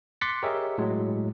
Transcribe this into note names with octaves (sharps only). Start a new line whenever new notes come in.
C6 D6 F#6 A6 B6 C#7
G4 G#4 A#4 C#5 D#5 E5
A2 F#3 G#3